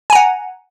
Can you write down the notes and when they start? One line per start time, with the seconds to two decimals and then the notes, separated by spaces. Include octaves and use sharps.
0.10 G#5
0.13 A#5
0.15 F#5